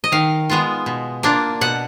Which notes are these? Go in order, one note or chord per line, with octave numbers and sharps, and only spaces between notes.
D#5
D#3 F5
G#3 B3 F4
B2
A#3 D4 F4
B2 F#5